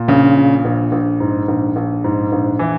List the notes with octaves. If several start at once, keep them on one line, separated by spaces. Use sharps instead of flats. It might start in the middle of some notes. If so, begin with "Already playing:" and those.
Already playing: A#2
A#1 C#3
A#2
A#1
A#1
G#2
A#1
A#1
G#2
A#1
E3 E4